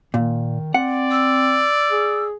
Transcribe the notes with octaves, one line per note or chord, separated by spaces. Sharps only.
A#2 D#3
C4 D5 F#5
E6
G#4